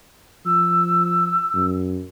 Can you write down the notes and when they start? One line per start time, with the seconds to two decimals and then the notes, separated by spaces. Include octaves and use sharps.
0.46 F3 E6
1.54 F#2